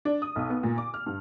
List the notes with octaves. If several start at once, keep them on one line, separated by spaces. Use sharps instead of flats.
D4
D#6
B1
B3
A#2
D6
F6
G2